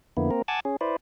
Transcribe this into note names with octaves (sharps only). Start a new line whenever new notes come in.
F2 D3 A#3 B3 E4
A#3 C4 A#4
F#5 G#5 A5 D6 E6
C#4 G#4
E4 B4 C5 D5